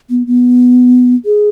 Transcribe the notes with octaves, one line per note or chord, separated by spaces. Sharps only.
B3
B3
G#4